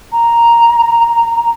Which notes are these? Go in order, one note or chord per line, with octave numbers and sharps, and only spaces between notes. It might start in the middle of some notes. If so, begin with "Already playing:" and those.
A#5